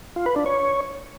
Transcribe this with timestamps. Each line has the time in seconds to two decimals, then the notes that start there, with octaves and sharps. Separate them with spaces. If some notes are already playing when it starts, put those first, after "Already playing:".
0.16 F4
0.26 B4
0.36 D4
0.46 C#5